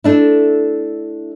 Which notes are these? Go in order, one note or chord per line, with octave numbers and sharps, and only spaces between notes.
A3 D4 E4